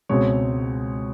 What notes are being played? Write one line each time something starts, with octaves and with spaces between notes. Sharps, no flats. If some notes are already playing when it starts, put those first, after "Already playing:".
C#2 B2 G#3 C4 C#5